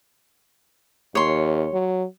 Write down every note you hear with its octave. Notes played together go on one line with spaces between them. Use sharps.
D#2 C#5 C6
F#3